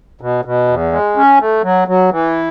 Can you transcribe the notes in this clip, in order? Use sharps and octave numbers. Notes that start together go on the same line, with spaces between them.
B2
B2
E2
G#3
C#4
A3
F#3
F#3
E3